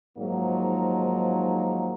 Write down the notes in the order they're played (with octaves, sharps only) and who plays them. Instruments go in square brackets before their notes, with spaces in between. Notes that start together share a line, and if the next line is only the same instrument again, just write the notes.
[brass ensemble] G#2 D#3 F3 F#3 A#3 D#4